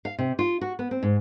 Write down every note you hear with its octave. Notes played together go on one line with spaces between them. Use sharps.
F5
C3
F4
F#4
B3
C4
G#2